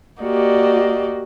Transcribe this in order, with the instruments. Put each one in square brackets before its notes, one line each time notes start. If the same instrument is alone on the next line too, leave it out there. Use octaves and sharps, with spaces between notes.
[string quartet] A#3 F#4 G4 D5 D#5